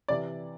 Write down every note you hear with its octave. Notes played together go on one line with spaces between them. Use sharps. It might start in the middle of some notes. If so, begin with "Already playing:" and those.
C3 E3 D5